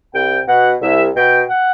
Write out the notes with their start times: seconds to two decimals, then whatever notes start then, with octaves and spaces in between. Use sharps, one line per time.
0.13 C2 G5
0.47 B2 F#5
0.81 C2 E5
1.16 B2 G5
1.49 F#5